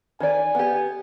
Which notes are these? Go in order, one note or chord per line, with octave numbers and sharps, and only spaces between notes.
D#3 D5 G#5
B3 G4